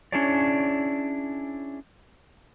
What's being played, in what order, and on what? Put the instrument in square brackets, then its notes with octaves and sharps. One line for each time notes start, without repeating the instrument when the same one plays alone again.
[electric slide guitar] C#4 D4 E4 G#4 C#5 D5